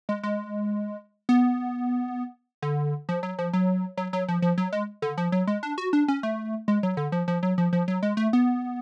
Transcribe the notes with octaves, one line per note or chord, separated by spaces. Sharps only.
G#3
G#3
B3
D3
F3
F#3
F3
F#3
F#3
F#3
F3
F3
F#3
G#3
D3
F3
F#3
G#3
D4
F#4
D4
C#4
A3
G#3
F#3
D3
F3
F3
F#3
F3
F3
F#3
G#3
A3
B3